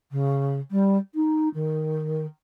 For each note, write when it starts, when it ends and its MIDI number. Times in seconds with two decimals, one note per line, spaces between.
0.11 0.59 49
0.71 0.97 55
1.15 1.49 63
1.54 2.26 51